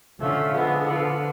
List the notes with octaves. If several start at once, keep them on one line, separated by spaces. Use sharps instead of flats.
D3 F3 A3 C#4 F4
D3 F3 G#3 B3
F3 B3 F4